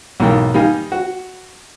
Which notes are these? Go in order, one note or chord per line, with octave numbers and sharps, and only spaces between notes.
B1 E2 G#2 A#3 G5
D#3 G3 D#4 F5 G#5
F#4